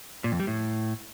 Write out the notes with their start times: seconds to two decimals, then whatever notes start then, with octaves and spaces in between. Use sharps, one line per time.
0.24 A#2
0.32 F2
0.40 G3
0.47 A2